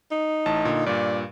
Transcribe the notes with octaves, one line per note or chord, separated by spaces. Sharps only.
D#4
A1 A2 A5
A#2 D3
G2 A#2 D5